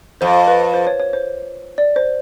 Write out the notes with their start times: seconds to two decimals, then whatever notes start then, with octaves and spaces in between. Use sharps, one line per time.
0.21 F2 C5
0.48 B4
0.74 C5
0.87 C#5
1.00 C#5
1.13 C5
1.78 D5
1.96 C5